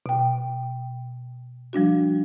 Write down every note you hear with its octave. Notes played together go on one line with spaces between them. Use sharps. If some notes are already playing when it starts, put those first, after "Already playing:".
B2 G5
F3 G3 D4 F#4